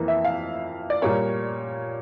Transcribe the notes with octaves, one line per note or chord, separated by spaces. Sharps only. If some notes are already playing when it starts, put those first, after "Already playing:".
Already playing: F2 E3 A#3
E5
F5
D5
A#2 G3 A#3 C#5